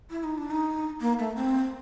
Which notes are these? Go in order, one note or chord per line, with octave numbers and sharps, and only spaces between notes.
E4
D#4
D4
D#4
A#3
A3
C4